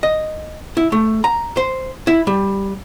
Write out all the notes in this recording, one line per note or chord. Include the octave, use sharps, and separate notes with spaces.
D#5
E4
A3
A#5
C5
E4
G3